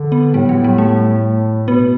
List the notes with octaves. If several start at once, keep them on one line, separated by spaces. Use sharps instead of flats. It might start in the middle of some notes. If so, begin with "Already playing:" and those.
Already playing: D3
B3
A2 G3
F#3
G3
A3
B2 B3